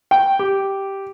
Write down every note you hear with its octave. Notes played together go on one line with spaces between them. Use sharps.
G5
G4